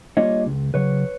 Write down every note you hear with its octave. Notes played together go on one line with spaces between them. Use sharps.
G3 A#3 D4 F4 C#5 D#5
C#2
C#3 F#3 B4 C#5